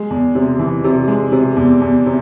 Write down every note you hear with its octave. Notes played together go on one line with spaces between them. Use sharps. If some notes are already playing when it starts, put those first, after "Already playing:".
Already playing: G#3
E2
C3
E3
C3
G#3
C3
E2
E2
C3